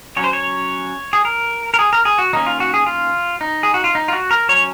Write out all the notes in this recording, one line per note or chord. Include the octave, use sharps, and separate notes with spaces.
F#3 C#4 C#5
C5
C#5
G#4
A#4
A#4
G#4
A#4
G#4
F#4
D#3 A#3 C#4 D#4
F4
F#4
G#4
F4
D#4
G#4
F#4
F4
D#4
F4
F#4
A#4
F#3 C#4 C#5